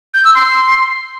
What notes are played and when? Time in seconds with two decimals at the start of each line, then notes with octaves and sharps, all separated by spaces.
0.14 G6
0.24 E6
0.34 C6